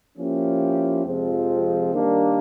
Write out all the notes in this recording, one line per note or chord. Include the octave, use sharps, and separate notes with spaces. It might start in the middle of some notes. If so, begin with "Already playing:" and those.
F3 A#3 C#4 E4 G4
F2 C3 F3 G#3 C4
D#3 G3 A#3 D4